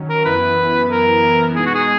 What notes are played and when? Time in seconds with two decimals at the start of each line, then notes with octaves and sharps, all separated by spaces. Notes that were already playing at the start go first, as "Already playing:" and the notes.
Already playing: D#3 F#3 C#4
0.09 A#4
0.25 F#2 E3 B3 E4 B4
0.91 A#4
1.55 B2 G#3 D#4 G#4
1.66 F#4
1.75 G#4